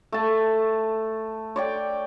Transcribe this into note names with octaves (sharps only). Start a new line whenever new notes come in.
A3 A5
C#5 D5 G5